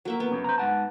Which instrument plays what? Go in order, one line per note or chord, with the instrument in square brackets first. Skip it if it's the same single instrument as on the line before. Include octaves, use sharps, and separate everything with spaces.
[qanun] F#3 A#3 E5
B3
[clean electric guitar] F#2 C#3
C5 A#5
G#2 F#5 A5